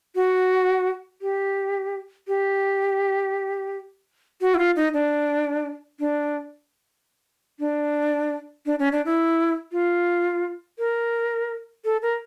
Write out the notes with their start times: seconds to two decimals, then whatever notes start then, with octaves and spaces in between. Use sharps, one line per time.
0.15 F#4
1.22 G4
2.28 G4
4.41 F#4
4.55 E4
4.59 F4
4.76 D#4
4.94 D4
6.00 D4
7.60 D4
8.66 D4
8.79 C#4
8.92 D4
9.05 E4
9.72 F4
10.79 A#4
11.85 A4
12.02 A#4